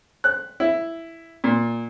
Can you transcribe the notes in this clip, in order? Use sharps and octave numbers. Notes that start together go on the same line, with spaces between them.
F#6
E4
A#2